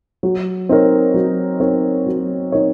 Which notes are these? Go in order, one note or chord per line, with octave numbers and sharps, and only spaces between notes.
F#3
C4 D#4 A#4 C#5
F#3
C4 D#4 A#4 C#5
F#3
C4 D#4 A#4 C#5